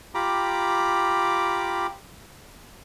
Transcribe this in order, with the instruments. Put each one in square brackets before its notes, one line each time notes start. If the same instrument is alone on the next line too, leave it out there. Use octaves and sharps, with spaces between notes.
[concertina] F4 G4 A#5 B5 D6